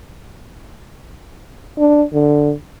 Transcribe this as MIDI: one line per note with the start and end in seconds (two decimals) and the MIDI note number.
1.79 2.03 62
2.13 2.53 50